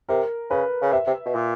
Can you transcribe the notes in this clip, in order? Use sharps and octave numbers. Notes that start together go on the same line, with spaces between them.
C3 A#4
C#3 B4
C#3
C3 E5
C3
B2
A#2